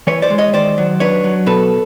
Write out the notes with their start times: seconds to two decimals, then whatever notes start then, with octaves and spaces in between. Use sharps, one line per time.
0.07 E3 B4 C#5
0.22 C5 D5
0.30 G#3
0.38 C#5 D#5
0.53 D#3 C5 D5
0.78 F#3
1.00 D4 B4 C#5
1.24 F#3
1.46 B2 A4 B4